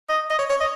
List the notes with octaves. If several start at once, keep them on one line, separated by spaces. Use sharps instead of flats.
D#5
D#5
C#5
C#5
D#5